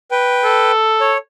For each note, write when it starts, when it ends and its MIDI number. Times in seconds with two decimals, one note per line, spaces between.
0.11 0.72 71
0.11 0.72 79
0.44 1.15 69
1.01 1.17 73